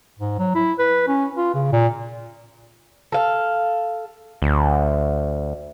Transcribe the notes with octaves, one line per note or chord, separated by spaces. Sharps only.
G#2
F#3
E4
B4
C#4
F4
C#3
A#2
A4 F5
D2